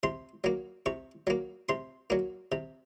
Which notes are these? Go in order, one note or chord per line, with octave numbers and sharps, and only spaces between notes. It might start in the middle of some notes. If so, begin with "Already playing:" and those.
C3 C6
F#3 A#3
C3 C#6
F#3 A#3
C3 C6
F#3 A#3
C3